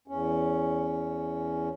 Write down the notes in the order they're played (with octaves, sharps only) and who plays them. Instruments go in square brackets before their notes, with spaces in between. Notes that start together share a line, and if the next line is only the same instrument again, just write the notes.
[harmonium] E2 C#4